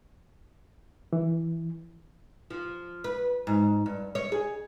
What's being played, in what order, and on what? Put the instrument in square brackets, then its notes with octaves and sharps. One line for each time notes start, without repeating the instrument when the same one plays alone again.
[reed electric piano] E3
[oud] F3
B4
G#2
G2
C#5
G#4